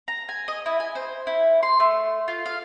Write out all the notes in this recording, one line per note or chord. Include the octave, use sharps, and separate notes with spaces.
A#5
G#5
D#5
E4
G#5
C5
E4
C6
A3
F4
F5